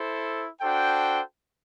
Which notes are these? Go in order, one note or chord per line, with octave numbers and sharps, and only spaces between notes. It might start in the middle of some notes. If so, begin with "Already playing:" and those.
Already playing: E4 A4 C5
D4 F#4 A4 C5 G5